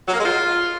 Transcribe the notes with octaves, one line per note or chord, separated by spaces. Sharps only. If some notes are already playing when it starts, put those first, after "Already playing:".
F#3
A#3
G#3
F4